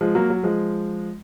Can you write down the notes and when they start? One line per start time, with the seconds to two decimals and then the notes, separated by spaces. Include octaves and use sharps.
0.01 F3 G#3
0.15 F#3 A#3
0.30 F#3
0.43 F3 G#3